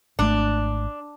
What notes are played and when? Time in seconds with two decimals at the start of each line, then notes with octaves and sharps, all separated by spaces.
0.19 G#1 A3 D4